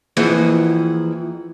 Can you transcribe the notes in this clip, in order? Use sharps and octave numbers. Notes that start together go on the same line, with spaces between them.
F2 E3 A#3 G#4 F#5